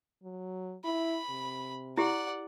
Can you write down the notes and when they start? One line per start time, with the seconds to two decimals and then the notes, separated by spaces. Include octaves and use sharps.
0.23 F#3
0.85 E4 B5
1.30 C3
1.98 E4 G4 D5 F#5